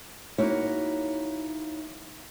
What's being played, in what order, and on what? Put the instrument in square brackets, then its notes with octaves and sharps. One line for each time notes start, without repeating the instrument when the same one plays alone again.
[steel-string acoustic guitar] A#3 D#4 E4 F#4 C#5